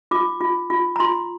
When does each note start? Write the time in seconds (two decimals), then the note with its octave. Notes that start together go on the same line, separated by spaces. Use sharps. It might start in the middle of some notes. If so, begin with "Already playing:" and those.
0.11 F4 D6
0.41 F4
0.70 F4
0.96 A#5
1.00 F4 C6